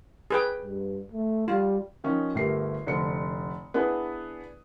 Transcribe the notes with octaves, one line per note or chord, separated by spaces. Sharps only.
G#4 B4 G5
G2
A3
G3 F4
D#3 F3 C#4 D#4
G1 A3 G4 A#4 C7
F1 D3 C5 C#7
B3 D4 E4 G#4 B4